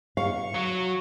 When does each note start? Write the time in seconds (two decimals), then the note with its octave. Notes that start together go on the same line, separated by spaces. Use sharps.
0.17 F5 C#6
0.55 F#3 F#4